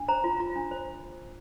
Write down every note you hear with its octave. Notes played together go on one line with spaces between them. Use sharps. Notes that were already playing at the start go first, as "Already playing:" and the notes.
Already playing: D4
C5 A#5
F4
F4
D4
C5